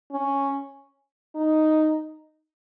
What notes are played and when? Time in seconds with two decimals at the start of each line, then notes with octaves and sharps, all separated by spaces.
0.12 C#4
1.35 D#4